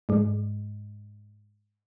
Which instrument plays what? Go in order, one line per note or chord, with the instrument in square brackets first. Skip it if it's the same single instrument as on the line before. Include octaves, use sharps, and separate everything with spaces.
[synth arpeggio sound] G#2 G#3